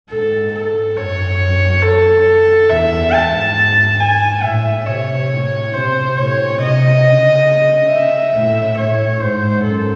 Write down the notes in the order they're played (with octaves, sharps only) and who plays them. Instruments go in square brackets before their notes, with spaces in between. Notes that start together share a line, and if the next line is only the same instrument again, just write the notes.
[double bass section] G#2 [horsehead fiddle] A4
[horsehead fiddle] A4
[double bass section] F#2 [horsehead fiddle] C#5
[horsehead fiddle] A4
[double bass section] E2 [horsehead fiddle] E5
[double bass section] G#2 [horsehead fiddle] A5
[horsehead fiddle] G#5
[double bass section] A2 [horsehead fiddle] E5
[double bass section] C3 [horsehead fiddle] C#5
[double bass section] A2
[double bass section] C3 [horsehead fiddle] C5
[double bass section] A2 [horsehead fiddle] C#5
[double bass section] C3 [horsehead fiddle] D#5
[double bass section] C#3
[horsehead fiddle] E5
[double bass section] A2
[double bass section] A2 [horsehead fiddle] C#5
[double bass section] G#2 [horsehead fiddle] C5
[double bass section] F#2 [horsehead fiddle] A4